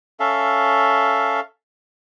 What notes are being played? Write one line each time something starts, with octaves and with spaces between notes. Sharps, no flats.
C#4 A4 E5 F5